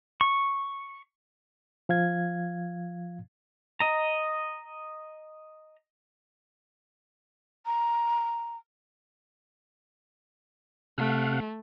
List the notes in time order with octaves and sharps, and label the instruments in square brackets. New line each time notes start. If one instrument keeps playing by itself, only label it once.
[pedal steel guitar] C#6
[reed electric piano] F3 F5 G#6
[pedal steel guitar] D#5 A#5
[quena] A#5
[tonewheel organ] C3 F5 F#5 [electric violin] A3